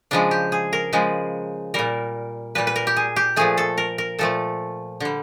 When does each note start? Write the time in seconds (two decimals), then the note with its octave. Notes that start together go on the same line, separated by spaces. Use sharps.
0.11 C#3 F3 G#3 D4
0.31 G4
0.52 G#4
0.73 A#4
0.93 C#3 F3 G#3
1.74 A#2 G3 A#4
2.55 A#2 G3 B4
2.67 B4
2.76 A#4
2.87 G4
2.96 G#4
3.16 G4
3.36 A#2 F3 A3 G#4
3.58 A4
3.78 A#4
3.98 A#4
4.19 A#2 F3 A3 A4
5.00 D3 G3